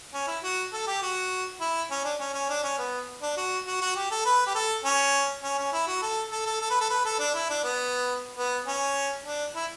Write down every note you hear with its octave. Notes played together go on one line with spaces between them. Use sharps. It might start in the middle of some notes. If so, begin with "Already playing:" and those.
C#4
E4
F#4
A4
G4
F#4
E4
C#4
D4
C#4
C#4
D4
C#4
B3
D4
F#4
F#4
F#4
G4
A4
B4
G4
A4
C#4
C#4
C#4
E4
F#4
A4
A4
A4
A4
B4
A4
B4
A4
D4
E4
D4
B3
B3
C#4
D4
E4